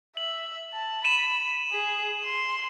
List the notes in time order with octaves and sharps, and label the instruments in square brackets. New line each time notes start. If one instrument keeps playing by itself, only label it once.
[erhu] E5 [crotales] F#7
[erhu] A5
[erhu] B5 [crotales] D#7 E7 F#7
[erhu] G#4
C6